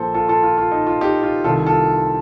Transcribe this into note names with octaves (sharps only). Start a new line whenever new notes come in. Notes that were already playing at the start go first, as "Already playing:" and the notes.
Already playing: A#1 A#2 A4 C5
F4 A4
F4 A4
F4
F4
D#4
F4
D#4 G4
F4
C2 C3 D#3 F4 A4
F4 A4